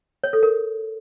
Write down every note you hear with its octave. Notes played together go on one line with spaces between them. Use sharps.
C#5
A4
A#4